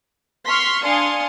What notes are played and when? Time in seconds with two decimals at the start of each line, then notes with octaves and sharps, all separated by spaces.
0.45 C6 C#6 F6 B6
0.82 D4 F5 G#5 C6 D#6 C#7